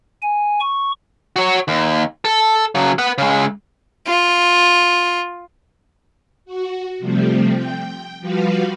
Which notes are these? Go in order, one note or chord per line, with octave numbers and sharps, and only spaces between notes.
G#5
C#6
F#4 C#5
D#2
A4
C#3 F#3
B4 F#5
C#3 G#3
F4
F#4
C3 F3 G3 A3 C4
G5
F3 G3 F#4 B4 F5